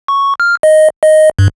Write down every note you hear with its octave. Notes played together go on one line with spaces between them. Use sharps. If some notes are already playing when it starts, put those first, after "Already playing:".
C#6
F6
D#5
D#5
G2